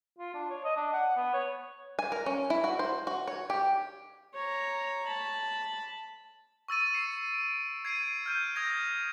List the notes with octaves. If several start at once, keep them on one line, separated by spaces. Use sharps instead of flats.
F4
D4
C#5
D#5
D4
F#5
B3
C#5
G#5
A#4
C#4
E4
F#4
C5
F#4
C#5
G4
C#5 A#5
A5 B5
C#6 E6 A6 D#7
C7 C#7 E7
D7
G#6 C7 D7 D#7
F6 G6 D#7
D#6 G#6 A#6